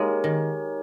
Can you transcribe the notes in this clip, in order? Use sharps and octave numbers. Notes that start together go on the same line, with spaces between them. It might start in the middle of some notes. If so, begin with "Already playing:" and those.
Already playing: G#3 A#3 D#4 G4 A#4 C#5 G#5
D#3